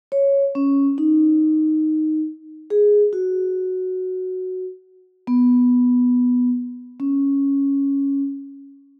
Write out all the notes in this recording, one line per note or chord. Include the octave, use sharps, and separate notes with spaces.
C#5
C#4
D#4
G#4
F#4
B3
C#4